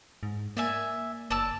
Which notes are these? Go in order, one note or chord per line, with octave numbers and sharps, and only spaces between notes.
G#2
A#3 D5 E5 G#5
F#1 D5 A5 E6